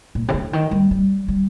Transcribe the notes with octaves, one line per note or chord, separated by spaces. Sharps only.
A#2
C3
D3
D#3
G3
G3
G3